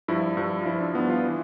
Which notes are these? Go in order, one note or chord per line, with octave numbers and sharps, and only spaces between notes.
G2 F3 E4
G2 F3 E4
F4
G2 F3 E4
D4
G2 F3 B3
F4
E3